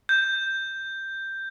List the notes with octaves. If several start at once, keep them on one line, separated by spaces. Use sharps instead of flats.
G6